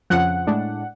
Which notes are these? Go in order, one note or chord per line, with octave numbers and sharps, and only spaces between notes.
F2 C#3 F3 F#5
A2 G#3 D4